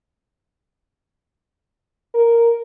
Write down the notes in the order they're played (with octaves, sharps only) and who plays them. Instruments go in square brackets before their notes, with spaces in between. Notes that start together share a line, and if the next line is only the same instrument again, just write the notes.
[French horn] A#4